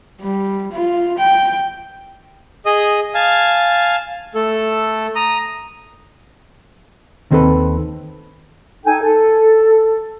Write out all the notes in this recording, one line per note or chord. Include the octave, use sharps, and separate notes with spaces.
G3
F4
G5
G#4 D#5 D#6
F5 G#5 A5
A3 A4
A#5 D#6
D#2 D#3 C4 G4 A4 B4
D#4 A4 G5 G#5
A4